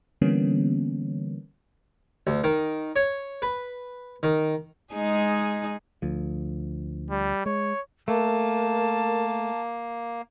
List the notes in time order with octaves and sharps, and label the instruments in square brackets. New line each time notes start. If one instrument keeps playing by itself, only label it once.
[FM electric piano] D3 E3 G3 A#3 B3 C#4
[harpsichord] D2
D#3
C#5
B4
D#3
[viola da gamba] G#3 D#4 G#4
[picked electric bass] D2 F3
[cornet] G3
[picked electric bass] G#3 [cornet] C#5
[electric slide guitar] A3 [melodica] A#3 [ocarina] A#4 [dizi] A5